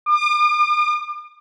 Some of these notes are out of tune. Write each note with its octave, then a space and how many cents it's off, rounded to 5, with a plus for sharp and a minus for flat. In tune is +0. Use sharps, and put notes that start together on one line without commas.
D6 +40